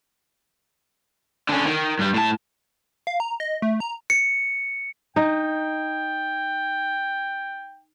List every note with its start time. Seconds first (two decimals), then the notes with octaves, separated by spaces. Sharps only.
1.49 D3 C#4
1.66 D#3
1.99 G2 G3
2.14 A2 A5
3.07 F5
3.20 A#5
3.40 D#5
3.62 A3
3.80 A#5
4.10 C#7
5.16 D#4 G5